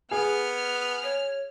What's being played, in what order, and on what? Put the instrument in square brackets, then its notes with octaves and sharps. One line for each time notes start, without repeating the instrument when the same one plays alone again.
[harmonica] B3 [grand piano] G#4 [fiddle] F6
[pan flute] C#5